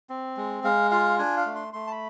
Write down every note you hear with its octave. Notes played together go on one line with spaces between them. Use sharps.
C4
G#3
G#3 F5
F4 F5
D4 G#5
F5
A3
C6
A3 C6
A5
B5